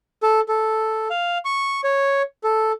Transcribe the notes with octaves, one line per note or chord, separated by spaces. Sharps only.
A4
A4
F5
C#6
C#5
A4